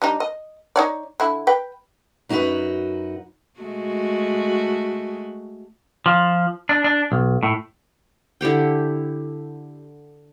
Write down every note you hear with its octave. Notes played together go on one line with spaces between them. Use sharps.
G3 D4 D#4
D#5
D#4 C#5 D5
D3 E4
B4 G5
F#2 D#4 F#4 G4 B4
G#3 A3 F#4
F3
D4
D4
B1
A2
D3 E4 G4 G5